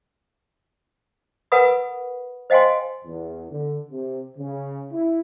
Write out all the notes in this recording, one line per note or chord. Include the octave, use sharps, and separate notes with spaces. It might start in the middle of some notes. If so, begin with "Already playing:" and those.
A#4 B4 F#5 G#5 B5 D#6
C5 D#5 F5 G5 G#5 C6
E2
D3
C3
C#3
E4